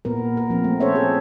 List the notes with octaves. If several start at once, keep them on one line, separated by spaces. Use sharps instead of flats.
A#2 B3 A#4
A#4
F3 C4
A3
C#4 A4 C5 C#5 E5
G#4 A4